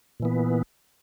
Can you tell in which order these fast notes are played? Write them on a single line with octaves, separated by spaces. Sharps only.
A#2 E3 B3